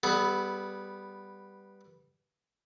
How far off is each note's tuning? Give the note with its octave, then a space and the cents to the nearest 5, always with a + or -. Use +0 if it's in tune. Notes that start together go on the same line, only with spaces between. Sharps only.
G3 +0 B3 +0 A4 -45